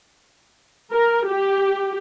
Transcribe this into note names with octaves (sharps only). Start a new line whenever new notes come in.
A#4
G4